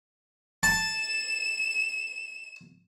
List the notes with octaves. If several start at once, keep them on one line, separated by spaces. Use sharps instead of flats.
A5 E7